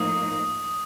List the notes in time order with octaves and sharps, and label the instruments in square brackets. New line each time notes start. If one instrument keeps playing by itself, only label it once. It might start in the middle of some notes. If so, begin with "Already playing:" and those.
Already playing: [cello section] A2 F3 A#3 D#4 [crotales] D#6